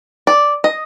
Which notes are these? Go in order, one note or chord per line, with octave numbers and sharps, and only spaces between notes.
D5
D#5